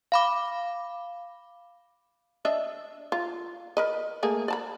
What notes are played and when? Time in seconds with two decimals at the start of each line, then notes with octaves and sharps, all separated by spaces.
0.12 F5 B5 D6
2.45 D4 D#5 E5
3.12 F4
3.77 A#4 B4 D#5
4.23 A3 A#3 G#4
4.48 D5 A5 B5